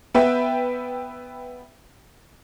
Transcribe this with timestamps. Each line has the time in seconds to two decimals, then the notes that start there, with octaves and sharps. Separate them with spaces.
0.14 B3 B4 E5 G5